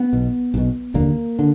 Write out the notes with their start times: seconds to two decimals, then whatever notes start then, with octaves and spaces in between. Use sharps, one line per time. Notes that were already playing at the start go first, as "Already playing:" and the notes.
Already playing: B3
0.13 B1 B2
0.54 B1 B2
0.94 F1 D#2 D3 A#3
1.39 D3